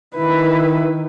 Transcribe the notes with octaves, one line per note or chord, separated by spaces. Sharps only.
D#3 E4 B4